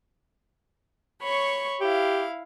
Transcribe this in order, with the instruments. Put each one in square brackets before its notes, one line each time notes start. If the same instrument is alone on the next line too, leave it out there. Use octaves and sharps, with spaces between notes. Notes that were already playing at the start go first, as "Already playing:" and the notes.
[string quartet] C#5 B5 C#6
[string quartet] E4 F5 [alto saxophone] G4